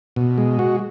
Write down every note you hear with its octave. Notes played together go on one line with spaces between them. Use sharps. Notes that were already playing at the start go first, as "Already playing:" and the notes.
B2
G#3
F#4